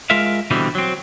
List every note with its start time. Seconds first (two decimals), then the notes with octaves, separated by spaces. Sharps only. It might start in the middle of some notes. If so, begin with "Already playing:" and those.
0.10 G#3 F4 A#4 E5 F5
0.51 B2 D3 E3 G3 C4
0.75 F#3 C4